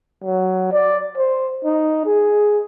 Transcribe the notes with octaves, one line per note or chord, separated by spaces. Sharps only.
F#3
D5
C5
D#4
G#4